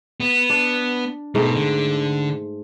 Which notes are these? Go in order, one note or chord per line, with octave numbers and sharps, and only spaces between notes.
B3
D4
G#2 B2 A3 G5
D3